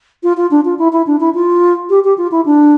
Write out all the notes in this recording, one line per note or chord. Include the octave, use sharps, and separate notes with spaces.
F4
F4
D4
F4
E4
E4
D4
E4
F4
G4
G4
F4
E4
D4